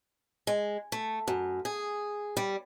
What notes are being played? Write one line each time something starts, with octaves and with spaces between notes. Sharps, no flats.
G#3
A3
F#2
G#4
G3